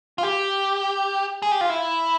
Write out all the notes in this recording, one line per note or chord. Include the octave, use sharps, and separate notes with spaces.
F4
G4
G#4
G4
F4
E4